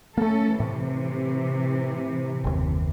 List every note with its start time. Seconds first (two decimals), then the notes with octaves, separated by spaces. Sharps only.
0.18 A3 A#3 C#4 A4
0.60 A2 C3 E3
2.44 F#1 D#2